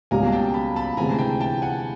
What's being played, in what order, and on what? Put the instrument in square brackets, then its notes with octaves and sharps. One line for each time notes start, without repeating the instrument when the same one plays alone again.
[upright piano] C#2 B2 G3 A#3 [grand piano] G#5 A#5
[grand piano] G5 A5
A5 B5
A5 B5
[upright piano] D2 C3 E3 G#3 [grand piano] G#5 A#5
[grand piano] G5 A5
G5 A5
F#5 G#5